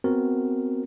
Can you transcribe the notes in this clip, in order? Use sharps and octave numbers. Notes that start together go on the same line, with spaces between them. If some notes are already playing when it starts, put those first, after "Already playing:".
B3 C4 F#4 A#4